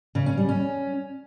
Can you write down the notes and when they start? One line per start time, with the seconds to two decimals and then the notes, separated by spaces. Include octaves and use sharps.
0.15 C#3
0.26 C#4
0.37 G3
0.49 C#4